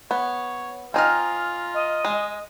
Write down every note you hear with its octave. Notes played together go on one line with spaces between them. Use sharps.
B3 C#5
C4 D#4 F4 G#5 A#5 F6
D#5
G#3